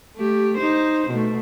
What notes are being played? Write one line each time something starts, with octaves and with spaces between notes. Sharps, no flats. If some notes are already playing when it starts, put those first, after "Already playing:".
A3 G4
D#4 C5
B2 A3